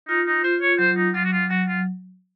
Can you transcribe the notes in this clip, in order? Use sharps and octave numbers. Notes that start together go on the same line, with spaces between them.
D#4 F4
D#4
F4 C5
C#5
F#3 C5
D#4
F#3 F4
F#4
F4
F#3 F#4
F4